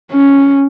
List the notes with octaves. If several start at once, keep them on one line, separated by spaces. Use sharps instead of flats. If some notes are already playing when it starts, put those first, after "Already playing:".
C#4